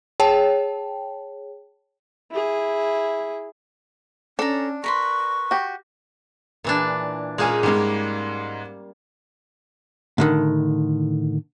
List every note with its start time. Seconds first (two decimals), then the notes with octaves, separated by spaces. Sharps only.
0.20 G#4 C#5 G5 A5
2.31 E4 G#4
4.39 C#4 D4 A4 A#5
4.84 A#4 B4 C6 C#6
5.51 F#4 G4
6.64 A#2 E3 D4
7.38 A#2 G#3 A#3 C#4 G#5
7.63 G#2 G3 G#3 A#3
10.18 A2 D3 D#3